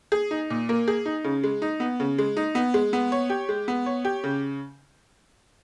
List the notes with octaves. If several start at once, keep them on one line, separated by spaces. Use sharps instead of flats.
G#4
D#4
A#2
A#3
G#4
D#4
C#3
G#3
D#4
B3
C#3
G#3
D#4
B3
G#3
B3
C#5
G4
G#3
B3
C#5
G4
C#3